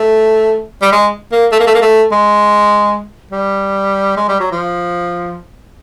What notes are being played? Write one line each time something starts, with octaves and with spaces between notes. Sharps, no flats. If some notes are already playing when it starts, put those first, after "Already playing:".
Already playing: A3
G3
G#3
A#3
A3
A#3
A3
A#3
A3
G#3
G3
G#3
G3
F#3
F3